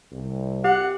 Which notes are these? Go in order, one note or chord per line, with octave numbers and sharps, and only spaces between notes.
C2
G4 F#5